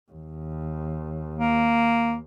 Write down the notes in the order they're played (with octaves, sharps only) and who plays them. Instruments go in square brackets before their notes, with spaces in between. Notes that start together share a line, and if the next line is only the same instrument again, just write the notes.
[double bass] D#2
[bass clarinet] A#3